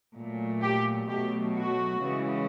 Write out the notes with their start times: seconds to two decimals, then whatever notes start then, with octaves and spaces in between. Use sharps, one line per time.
0.16 A#2 F#3 A3
0.63 G4
1.09 B2 F#3 A3 G4
1.56 F#4
2.02 C#3 E3 G#3 C#4